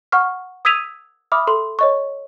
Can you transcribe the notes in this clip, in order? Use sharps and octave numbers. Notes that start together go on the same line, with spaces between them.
F#5 C#6 F6
D#6 E6 G#6 B6 D#7 F7
E5 B5 D6 D#6 F6
A4 C6
C#5 D#5 C#6